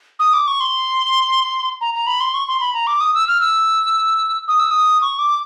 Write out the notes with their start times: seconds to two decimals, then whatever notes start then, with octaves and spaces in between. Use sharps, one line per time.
0.19 D#6
0.33 D6
0.47 C#6
0.60 C6
1.81 A#5
1.94 A#5
2.07 B5
2.20 C6
2.34 C#6
2.48 C6
2.61 B5
2.74 A#5
2.87 D6
3.01 D#6
3.14 E6
3.28 F6
3.41 E6
4.48 D#6
4.59 E6
4.71 D#6
5.02 C#6
5.19 D6